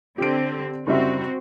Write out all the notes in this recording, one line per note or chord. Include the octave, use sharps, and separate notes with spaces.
D3 C4 G4 D7
F#1 G3 C4 F#4 E5